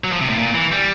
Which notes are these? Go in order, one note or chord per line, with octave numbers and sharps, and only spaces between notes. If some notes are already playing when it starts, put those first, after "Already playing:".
F#3
F3
C3
A2
A#2
E3
G3